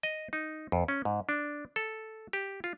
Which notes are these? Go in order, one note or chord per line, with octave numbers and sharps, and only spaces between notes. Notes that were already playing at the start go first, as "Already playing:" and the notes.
D#5
D#4
F2
C#4
G#2
D4
A4
G4
F4